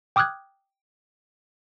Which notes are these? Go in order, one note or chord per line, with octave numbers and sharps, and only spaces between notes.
G5 D6 D#6 F6 F#6 G#6